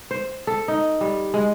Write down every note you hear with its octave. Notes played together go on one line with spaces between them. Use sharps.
C5
A4
D#4
G3
G#3